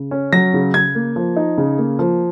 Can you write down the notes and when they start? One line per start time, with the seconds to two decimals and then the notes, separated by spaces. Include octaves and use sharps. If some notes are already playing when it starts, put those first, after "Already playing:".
Already playing: C#3
0.11 C#4
0.32 F#3 A#6
0.54 C#3
0.74 C#3 G#6
0.95 A#3
1.16 F3
1.36 D#4
1.58 C#3
1.78 A#3
1.99 F3